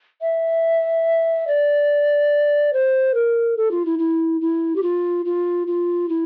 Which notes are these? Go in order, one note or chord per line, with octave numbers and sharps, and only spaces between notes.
E5
D5
C5
A#4
A4
F4
E4
E4
E4
G4
F4
F4
F4
E4